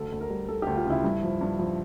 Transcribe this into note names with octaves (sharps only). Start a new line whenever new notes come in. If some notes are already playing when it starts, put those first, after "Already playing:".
Already playing: D2 A4
D2
A#4
G3
G3 A4
D2 G4
F4
C#3 E4
G2
F3
G2
F3